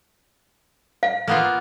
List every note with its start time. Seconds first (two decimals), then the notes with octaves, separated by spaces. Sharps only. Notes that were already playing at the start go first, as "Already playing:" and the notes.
1.03 F5
1.28 A#3 B3 F4